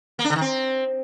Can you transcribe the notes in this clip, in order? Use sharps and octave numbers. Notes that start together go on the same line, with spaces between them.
A#3
D4
D3
D#3
C4